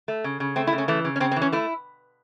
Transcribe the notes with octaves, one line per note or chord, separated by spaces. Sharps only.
A3
C#3
C#3
A3 C4
E4
C#3
C#4
E3 A3
C#3
C#4
C#3 C4
C4
E3
C#4
A3 E4